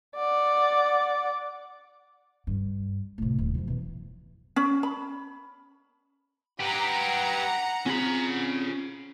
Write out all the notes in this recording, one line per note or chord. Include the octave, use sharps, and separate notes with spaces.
D5 F#5
G2
A2 C3
D#1
F#2 F3
B2 E3
C#4
B5
G4 B4 F#5 A#5
C4 C#4 F4 G#4 B5